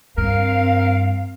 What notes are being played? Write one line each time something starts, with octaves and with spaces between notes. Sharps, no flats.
G2 C4 A#4 F5